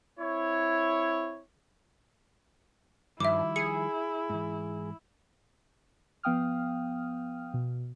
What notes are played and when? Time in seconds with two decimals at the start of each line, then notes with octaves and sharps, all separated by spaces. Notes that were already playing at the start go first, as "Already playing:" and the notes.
0.18 C4 E4 C#5
3.20 G2 D#3 F3 G3 E4 E5 D6
3.56 G#4 C#7
4.30 G#2 E3
6.23 F3 B3 F5 G5 D#6 F6
7.54 B2